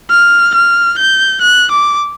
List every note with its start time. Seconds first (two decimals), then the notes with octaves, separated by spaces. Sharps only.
0.11 F6
0.54 F6
0.98 G6
1.42 F#6
1.71 D6